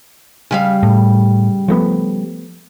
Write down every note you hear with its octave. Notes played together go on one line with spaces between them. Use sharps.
C#3 G3 F5
A2
F3 A3 B3